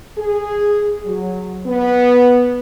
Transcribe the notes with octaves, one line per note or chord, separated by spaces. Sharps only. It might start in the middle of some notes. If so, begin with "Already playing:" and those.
G#4
F#3
B3